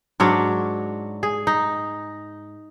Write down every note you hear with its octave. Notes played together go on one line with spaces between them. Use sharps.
G#2 F#3 D4 C#5
G#4
D#4